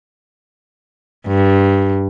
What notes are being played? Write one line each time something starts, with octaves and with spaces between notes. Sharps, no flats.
G2